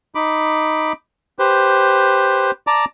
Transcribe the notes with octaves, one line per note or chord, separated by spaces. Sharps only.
D#4 B5 D6
G4 B4 C5
D5 A5 A#5 D6